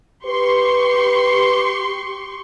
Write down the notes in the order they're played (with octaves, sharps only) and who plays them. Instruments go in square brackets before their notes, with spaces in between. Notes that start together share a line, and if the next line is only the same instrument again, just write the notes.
[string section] G4 C6 C#6 [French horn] B4